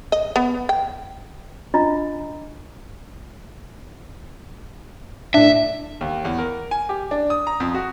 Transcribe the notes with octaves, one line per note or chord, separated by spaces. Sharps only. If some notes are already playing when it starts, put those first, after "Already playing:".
D#5
B3
G5
D4 F4 D#5 A#5 C6
A2 D4 E5
D#2
E2
A#4
G#5
G4
D4
D#6
A#5
F2
F#4